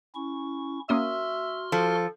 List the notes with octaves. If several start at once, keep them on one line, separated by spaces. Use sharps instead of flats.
C#4 E4 C#6
A#3 C#4 F#4 E5 C6 D#6 F6
F3 A4